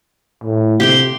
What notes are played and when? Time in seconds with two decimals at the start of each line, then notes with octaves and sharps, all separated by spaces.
0.44 A2
0.80 C3 G4 G5 C6